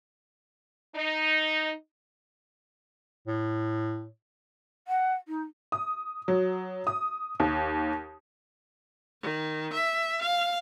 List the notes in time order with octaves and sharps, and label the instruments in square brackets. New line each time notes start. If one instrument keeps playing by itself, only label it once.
[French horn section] D#4
[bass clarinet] A2
[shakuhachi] F#5
D#4
[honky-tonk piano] D#6
F#3
D#6
D#2
[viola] D#3
E5
F5